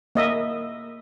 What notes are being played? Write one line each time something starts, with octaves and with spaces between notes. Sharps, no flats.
A#3 D#5 E5